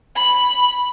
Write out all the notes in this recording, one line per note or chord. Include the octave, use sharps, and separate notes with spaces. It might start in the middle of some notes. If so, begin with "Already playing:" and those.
B5